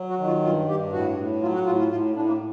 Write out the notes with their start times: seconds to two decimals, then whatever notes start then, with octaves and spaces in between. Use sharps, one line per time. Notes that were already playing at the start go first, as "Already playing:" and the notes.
Already playing: F#3
0.10 F#4
0.18 D#3
0.27 F4
0.43 G2 F4
0.68 G2 G4
0.92 A2 F#4
1.17 A2
1.42 F#3 F4
1.54 F#4
1.66 A2 F4
1.79 F4
1.91 A2 F4
2.16 A2 D4
2.28 A#3